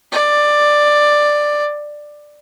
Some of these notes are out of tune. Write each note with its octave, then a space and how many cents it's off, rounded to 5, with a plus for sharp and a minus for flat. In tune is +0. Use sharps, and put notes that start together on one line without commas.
D5 +10